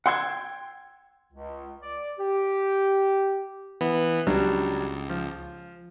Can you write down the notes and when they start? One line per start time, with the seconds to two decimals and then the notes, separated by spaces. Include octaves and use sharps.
0.06 F#5 G5 C6 E6 G#6
1.33 C#2
1.81 D5
2.18 G4
3.81 E3 B3
4.27 C#2 F#3 G3 D4
5.09 F3